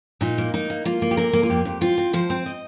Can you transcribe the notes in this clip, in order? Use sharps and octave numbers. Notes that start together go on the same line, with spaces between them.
A#2 D#4
A#3
A#3 D#4
A#3
A#3 F4
A#3
G4
A#2 A#4
A#3
F4
F2 G4
F2
C4 F4
C4
F3 C5
C4
D#5